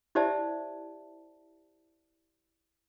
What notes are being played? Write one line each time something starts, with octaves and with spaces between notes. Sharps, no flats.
E4 G4 C5 D5 E5 A5